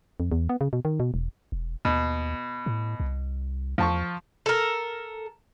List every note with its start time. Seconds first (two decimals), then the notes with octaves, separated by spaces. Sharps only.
0.20 F2
0.32 E2
0.49 B3
0.61 C#3
0.73 B2
0.85 D#3
1.00 B2
1.14 E1
1.52 E1
1.85 D#2 B2
2.66 A2
3.00 C2
3.78 E2 F3 A5 C#6
4.46 A4 A#4